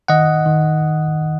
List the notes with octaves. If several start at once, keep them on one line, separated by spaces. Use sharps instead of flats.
D#3 D#5 F#5
D#3